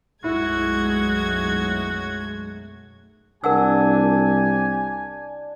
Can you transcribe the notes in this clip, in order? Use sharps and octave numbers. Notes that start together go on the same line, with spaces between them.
B1 F#2 G#3 A3 E4 F#4 G#6
C2 D4 G4 A#4 F#5 G#5 E6